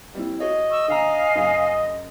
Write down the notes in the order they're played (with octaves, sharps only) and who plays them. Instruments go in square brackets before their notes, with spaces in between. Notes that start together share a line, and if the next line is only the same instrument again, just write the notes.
[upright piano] G3 C4 E4
[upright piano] F#4 G#4 C#5 [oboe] D#5
[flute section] C#6 E6
[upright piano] D3 A#5 [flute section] F5 G#5
[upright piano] F#2 C#3